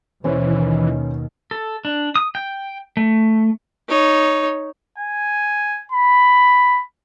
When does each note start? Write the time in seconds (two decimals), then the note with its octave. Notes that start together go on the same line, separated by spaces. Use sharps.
0.24 D#2 B2 D#3 E3 C#4 C5
1.51 A4
1.85 D4
2.16 D#6
2.35 G5
2.97 A3
3.89 D#4 C#5
4.98 G#5
5.92 B5